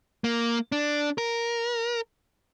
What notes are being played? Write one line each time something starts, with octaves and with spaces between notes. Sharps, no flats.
A#3
D4
A#4